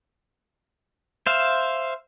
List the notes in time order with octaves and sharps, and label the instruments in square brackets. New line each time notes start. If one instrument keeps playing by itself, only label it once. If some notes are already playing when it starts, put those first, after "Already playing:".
[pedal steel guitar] C5 E5 F5